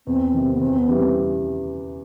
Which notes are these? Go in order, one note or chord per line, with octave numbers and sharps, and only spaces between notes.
E2 C4
C3 D#3
B3
E2 C4
B3
C#3 E3 G3
C4